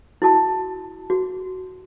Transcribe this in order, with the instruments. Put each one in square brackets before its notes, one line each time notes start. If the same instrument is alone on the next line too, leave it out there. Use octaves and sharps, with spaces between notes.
[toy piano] E4 F#4 A5
F#4